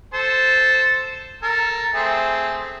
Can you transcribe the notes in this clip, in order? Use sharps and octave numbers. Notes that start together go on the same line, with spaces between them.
A4 C5
A4 A#4
A3 C4 G#4